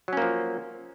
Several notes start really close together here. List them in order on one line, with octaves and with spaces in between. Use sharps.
F#3 C#4 A#3 F3